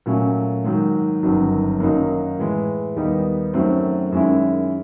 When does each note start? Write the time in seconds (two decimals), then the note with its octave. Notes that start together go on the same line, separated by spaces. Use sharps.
0.06 A#2 F#3 A3 C#4
0.64 G#2 D#3 F#3
1.23 G1 F#2 D#3 F#3
1.80 F#2 D#3 F#3 A#3 D#4
2.38 A2 E3 G#3
2.96 D#2 D#3 G3 B3 D#4
3.54 F#2 D#3 F#3 A3 C4
4.12 F#2 D#3 G#3 C#4 E4